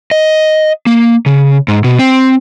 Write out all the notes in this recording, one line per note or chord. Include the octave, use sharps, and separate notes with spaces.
D#5
A#3
C#3
G#2
B2
C4